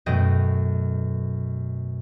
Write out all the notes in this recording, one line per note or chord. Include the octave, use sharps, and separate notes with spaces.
F#2 B2 F#3 A3 D#5 G5